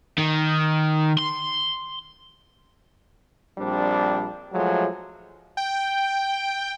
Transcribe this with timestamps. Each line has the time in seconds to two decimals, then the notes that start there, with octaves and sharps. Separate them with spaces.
0.18 D#3
1.18 C6
3.58 A#1 G3 C4 D4
4.53 F3 F#3 G#3 A3
5.57 G5